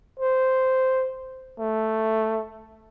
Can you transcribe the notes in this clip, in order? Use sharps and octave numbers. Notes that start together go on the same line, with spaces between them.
C5
A3